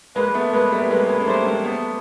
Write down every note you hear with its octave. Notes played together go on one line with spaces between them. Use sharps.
G#3 A#3 B4
A3 B3
G#3 A#3 B4
G3 A3
G#3 A#3 B4
G#3 A#3
A#3
G3 A3 C5
G#3 A#3
A3 B3